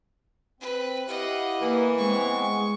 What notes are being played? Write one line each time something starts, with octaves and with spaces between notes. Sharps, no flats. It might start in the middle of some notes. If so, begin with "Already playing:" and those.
C4 B4
E4 G4 D#5 F5 F#5
E3 A#3
G#3 B3 C4 C#6